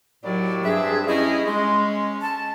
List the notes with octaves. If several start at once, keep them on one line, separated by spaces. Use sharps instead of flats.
D#2 A2 F#3 D5
G2 C4 D4 G#4 E5
C#4 E4 G#4 D#5
G#3 C#4 C6
A5